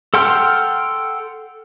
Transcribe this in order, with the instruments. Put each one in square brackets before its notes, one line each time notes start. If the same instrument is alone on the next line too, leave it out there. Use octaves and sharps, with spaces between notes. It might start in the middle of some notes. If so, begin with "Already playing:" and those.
[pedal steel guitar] A4 F#5 G5 C6 F6